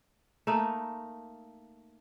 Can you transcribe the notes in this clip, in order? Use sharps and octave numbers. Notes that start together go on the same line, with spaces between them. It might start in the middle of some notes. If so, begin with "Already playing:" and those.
A3 A#3 D#4